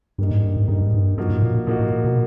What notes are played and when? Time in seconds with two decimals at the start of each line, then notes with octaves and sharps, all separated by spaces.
0.18 G2 G3 A#3 D#4
0.31 G#2
0.44 G2
0.56 G#2
0.68 G2 G3 A#3 D#4
0.81 G#2
0.94 G2
1.17 G2 F3 A#3 D#4 F#4
1.30 A2
1.42 A#2
1.55 A#2
1.67 A#2 F3 A#3 D#4 F#4
1.79 A2
1.92 A#2
2.04 B2